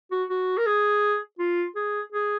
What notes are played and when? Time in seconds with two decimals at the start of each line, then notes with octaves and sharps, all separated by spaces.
0.11 F#4
0.30 F#4
0.58 A#4
0.67 G#4
1.39 F4
1.76 G#4
2.12 G#4